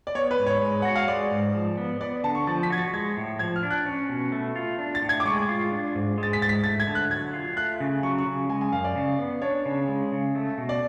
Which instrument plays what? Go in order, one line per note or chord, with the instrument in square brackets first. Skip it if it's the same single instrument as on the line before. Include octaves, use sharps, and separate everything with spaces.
[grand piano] D5
[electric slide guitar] B3 [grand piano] C#5
[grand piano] B4
[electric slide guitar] G#2
[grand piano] C#5
[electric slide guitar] G#3
[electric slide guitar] F#4 [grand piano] F#5
[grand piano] F5
[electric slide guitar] G#3 [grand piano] D5
[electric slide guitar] G#2
F3
B3
[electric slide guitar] B3 [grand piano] D5
[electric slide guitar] D3 [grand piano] A5
[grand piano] C#6
[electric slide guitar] F3 [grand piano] A6
[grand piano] B6
[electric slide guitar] F#4 [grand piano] G#6
[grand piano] A6
[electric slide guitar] G#3 [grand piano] G#6
[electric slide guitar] A2
[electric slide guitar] F3 [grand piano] G#6
[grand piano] F6
[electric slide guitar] D4
[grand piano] F#6
[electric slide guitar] C#4
B2
A3
F4
D4
[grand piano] A6
[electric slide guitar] A2
[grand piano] G#6
D6
[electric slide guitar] G#3 [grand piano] C#6
[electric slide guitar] F4
D4
G#2
[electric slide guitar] G#3 [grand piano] A6
[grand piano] B6
[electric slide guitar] G#2 [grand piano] A6
[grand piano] B6
[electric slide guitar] A3 [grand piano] A6
[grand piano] G#6
[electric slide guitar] D3
[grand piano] F#6
[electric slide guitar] F#3 [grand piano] G#6
[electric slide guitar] F4
[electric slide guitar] A3 [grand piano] F#6
[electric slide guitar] C#3
[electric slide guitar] F#3 [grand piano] C#6
[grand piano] C#6
[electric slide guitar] C#3
[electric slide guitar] G#3 [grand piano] G#5
[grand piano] G#5
[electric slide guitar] F#2 [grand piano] F5
[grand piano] D5
[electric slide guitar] C#3
B3
[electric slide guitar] D4 [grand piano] C#5
[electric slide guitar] C#3
G#3
C#3
A3
B2
[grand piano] D5